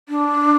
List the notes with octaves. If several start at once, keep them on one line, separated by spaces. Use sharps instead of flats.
D4